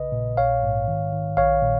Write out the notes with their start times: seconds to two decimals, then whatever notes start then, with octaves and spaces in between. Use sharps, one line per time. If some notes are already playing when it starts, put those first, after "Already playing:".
Already playing: A#1 C#3 B4 D#5
0.12 A#2
0.37 A#1 C#5 F5
0.63 G#2
0.88 D#3
1.12 D#3
1.37 A#1 C#5 F5
1.63 A#2